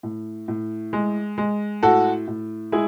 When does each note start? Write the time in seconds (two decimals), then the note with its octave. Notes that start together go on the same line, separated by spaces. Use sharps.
0.03 A2
0.48 A2
0.93 G#3
1.38 G#3
1.83 A2 F#4 A4
2.28 A2
2.72 G#3 E4 G#4